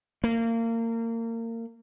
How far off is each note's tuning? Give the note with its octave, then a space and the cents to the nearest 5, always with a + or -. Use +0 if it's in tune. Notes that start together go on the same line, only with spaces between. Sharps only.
A#3 -30